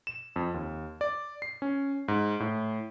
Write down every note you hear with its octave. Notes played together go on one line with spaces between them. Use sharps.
E7
F2
D#2
D5
C7
C#4
G#2
A2